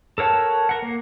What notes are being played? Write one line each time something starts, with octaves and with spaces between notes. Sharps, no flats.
A4 A#4 C#5 F#5 A5
A#4 F#5
A#3